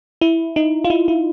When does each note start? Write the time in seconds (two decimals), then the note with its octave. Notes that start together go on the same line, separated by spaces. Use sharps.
0.21 E4
0.56 D#4
0.84 F4
0.90 E4
1.08 E4